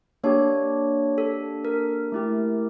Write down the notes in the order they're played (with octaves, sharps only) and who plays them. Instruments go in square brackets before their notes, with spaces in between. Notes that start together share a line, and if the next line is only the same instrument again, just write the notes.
[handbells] A#3 D4 G4 C#5
A4
A#4
A3 E4 G4